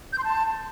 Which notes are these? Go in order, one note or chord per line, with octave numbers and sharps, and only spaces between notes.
G6
C6
A5